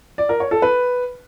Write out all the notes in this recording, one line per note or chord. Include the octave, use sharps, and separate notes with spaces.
D5
A#4
C#5
A4
B4